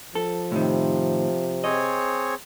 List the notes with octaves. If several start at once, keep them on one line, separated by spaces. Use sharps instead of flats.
F3 A4
A2 C3 D#3
C4 G#4 C#5 D#5